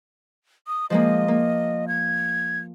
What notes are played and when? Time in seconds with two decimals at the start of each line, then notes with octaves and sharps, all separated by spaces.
0.67 D#6
0.90 F3 G#3 A#3 D#5
1.28 A#3
1.88 G#6